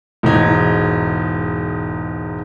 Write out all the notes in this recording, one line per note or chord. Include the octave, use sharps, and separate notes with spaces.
E1 G#2 D#4 G#6